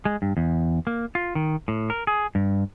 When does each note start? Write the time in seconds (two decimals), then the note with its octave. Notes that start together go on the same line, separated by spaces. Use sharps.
0.05 G#3
0.22 G2
0.37 E2
0.87 A#3
1.15 F4
1.35 D#3
1.68 A2
1.90 A#4
2.07 G#4
2.35 G2